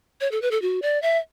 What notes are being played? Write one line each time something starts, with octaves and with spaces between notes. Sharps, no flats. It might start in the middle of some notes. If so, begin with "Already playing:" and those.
C#5
A4
B4
A4
F#4
D5
E5